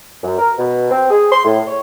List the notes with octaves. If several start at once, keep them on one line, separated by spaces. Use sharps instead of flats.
F#2
A#4
B2
C4
G#4
C6
A2
C#5